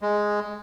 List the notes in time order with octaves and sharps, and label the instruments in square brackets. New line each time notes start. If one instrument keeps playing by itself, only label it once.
[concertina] G#3